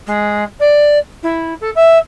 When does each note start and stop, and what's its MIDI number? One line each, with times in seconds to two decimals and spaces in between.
0.06 0.43 56
0.59 0.98 74
1.23 1.53 64
1.60 1.70 69
1.75 1.98 76